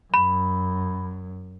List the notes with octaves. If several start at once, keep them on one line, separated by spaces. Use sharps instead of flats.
F#2 B5